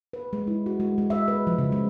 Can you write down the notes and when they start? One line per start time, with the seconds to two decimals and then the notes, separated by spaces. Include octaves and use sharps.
0.13 B4
0.33 G#3
0.47 E4
0.66 F#4
0.80 G#3
0.98 G#3
1.10 E5
1.28 B4
1.47 F3
1.58 C#3
1.72 G#3